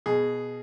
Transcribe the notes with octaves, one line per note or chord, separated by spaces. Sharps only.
B2 G#4